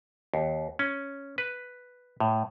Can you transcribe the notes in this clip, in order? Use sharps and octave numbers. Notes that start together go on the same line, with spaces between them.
D#2
C#4
B4
A2